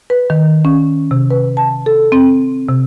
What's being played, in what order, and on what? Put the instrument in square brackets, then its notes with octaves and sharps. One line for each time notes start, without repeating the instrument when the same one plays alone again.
[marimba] B4
D#3
C#4
C3
B4
A5
A4
C4
C3